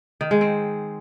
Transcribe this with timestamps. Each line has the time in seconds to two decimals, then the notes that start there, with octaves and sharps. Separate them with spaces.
0.21 D#3
0.31 G#3
0.41 C4